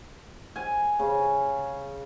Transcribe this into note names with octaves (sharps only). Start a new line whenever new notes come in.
G#5
C#3